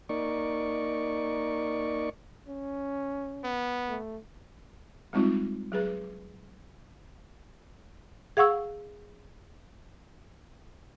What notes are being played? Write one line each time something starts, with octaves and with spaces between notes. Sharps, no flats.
A#3 D#4 D5 C#6
C#4
B3
A3
G3 G#3 C4 D#4 F4
F#3 G#4 B4
G#4 F5 F#5 C#6 E6